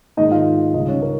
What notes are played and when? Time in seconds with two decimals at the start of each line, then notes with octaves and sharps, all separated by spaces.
0.17 G#2 D#3 A#3 D#4 D#5
0.31 F4 F5
0.74 C#2 C#3 G3 C#4 D#4 D#5
0.88 C#4 C#5
1.02 A#4